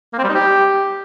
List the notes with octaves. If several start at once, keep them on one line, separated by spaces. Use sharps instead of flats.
A#3
C4
G3
D#4
G4